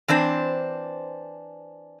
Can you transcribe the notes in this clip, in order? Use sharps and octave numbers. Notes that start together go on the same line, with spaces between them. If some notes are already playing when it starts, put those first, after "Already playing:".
E3 C4 D4 C5